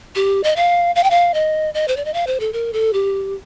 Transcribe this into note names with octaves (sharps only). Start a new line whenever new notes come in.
G4
D#5
F5
F5
G5
F5
D#5
D#5
C5
D5
D#5
F5
C5
A4
A#4
A4
G4